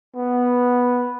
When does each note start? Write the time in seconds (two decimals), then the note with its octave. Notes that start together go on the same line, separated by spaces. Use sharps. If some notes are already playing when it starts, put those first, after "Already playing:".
0.15 B3